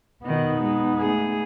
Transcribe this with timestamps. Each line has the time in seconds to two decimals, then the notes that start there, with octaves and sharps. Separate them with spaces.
0.24 B2 D#3 B3 D#4
0.63 G#3
0.99 A3 G#4